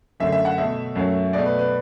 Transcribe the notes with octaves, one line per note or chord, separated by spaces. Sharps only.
F#2 D3 A3 E5
E5
F#5
B2 A3 E5
F#2 F#3 A3
B2 A3 D5
B4
B4